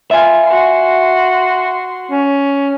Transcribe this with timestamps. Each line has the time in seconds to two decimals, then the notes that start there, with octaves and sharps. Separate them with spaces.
0.11 F4 E5 G#5
0.46 F#4 C6
2.11 C#4